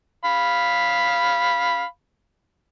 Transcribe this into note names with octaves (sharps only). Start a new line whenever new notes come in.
F5 B5